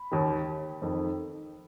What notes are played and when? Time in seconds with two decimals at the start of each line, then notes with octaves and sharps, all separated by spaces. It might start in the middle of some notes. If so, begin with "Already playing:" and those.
Already playing: B5
0.11 D#2 D#3
0.82 F2 D#3